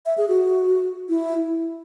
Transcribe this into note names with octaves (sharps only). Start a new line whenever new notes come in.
E5
G#4
F#4
E4